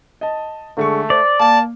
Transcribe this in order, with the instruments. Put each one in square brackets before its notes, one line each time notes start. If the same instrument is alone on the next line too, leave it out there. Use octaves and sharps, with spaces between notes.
[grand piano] D#5 A5
[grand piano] D3 G#3 C#6 [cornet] A3
[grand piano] C5 [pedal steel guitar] D5
[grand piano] A#3 [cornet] A5